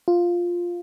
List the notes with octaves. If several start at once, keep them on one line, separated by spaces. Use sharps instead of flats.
F4